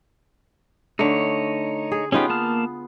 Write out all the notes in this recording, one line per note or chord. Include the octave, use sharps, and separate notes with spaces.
D3 A3 D#4 C#5
G#4
B3 C#4 D#4 F4 G4 G#4
A#3 A5 F6